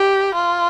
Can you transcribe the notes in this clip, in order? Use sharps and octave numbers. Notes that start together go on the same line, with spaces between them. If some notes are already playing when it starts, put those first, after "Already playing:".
Already playing: G4
F4